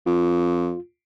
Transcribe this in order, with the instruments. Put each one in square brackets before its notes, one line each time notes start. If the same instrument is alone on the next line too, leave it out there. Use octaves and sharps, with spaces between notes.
[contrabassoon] F2 [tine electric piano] F4